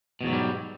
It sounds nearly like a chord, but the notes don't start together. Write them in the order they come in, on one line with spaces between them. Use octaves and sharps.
B2 E2 F#3 G#2 G3